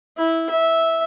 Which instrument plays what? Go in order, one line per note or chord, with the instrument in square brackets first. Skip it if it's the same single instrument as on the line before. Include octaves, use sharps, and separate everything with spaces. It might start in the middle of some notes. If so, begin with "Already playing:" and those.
[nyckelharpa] E4
E5